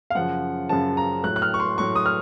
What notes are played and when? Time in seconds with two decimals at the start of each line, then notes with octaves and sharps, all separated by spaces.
0.10 F5
0.15 F#2 C#3 F3 F#5
0.69 F#2 C#3 F3 A5
0.97 A#5
1.23 A2 F#3 F#6
1.36 F#6
1.42 F6
1.54 C#6
1.60 C6
1.78 A2 F#3 C#6
1.96 D#6
2.06 F6